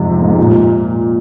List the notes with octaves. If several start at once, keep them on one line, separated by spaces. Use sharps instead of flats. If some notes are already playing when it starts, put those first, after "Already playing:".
Already playing: F2 G#2 C3
G#2
A#2